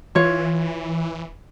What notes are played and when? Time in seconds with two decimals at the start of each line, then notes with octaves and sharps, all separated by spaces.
0.15 E3 F4 C#5